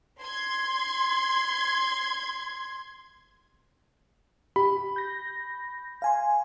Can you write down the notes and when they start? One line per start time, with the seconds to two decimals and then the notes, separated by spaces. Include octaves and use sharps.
0.22 C6 G#6
4.56 G4 B5
4.96 G6 A#6
6.02 F5 G#5 C6